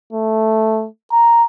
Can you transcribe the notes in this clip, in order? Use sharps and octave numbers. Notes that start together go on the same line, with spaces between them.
A3
A#5